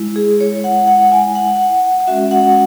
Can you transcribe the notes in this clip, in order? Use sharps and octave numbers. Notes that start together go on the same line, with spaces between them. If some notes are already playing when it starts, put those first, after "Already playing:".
Already playing: G#3 E4
G#4
C#5
F#5
F#5
G#5
F#5
G#3 C#4 F#4 E5
F#5